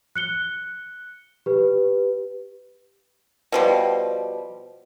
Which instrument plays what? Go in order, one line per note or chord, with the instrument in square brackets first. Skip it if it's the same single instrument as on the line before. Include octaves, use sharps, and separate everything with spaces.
[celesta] F#6 C#7 G7
G4 B4
[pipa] B2 F3 G3